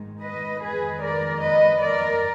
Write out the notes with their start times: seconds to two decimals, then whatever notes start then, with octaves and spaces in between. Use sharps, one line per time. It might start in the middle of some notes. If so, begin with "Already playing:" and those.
Already playing: G#2 D#3 G#3
0.21 B4 D#5
0.61 F2 D#3 G#3 G#4 B4
1.02 A#4 D5
1.43 B4 D#5
1.83 A#4 D5